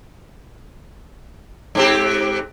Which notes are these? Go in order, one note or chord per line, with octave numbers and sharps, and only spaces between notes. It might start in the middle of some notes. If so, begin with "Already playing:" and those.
G#2 C4 G4